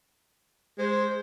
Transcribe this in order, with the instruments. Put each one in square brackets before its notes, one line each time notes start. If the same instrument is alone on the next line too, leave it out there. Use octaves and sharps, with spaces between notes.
[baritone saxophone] G#3 [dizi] C5